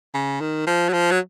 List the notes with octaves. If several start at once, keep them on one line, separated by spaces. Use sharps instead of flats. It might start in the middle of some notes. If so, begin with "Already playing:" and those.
C#3
D#3
F3
F#3
F3
F#3